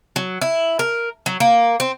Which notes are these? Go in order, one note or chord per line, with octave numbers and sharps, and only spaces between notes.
F#3
E4
A#4
F#3
A#3
C4